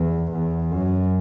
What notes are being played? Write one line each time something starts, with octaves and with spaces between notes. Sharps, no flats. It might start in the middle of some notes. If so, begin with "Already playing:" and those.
Already playing: E2
E2
F#2